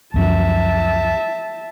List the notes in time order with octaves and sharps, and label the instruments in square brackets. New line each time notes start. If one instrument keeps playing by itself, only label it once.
[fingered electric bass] C#2 F#2 F3 [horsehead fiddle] E5 A5